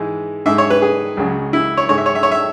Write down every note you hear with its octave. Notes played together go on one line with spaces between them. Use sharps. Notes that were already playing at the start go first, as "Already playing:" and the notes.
Already playing: G#2 E3 G#3
G#2 G#3 E5
C#5
B4
G#4
C#2 C#3 F#3
E4
C#5
G#2 G#3 C#5
E5
C#5
E5
C#5
E5